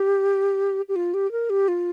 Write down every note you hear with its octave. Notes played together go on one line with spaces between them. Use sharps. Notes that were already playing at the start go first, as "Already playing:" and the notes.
Already playing: G4
G4
F4
G4
A#4
G4
F4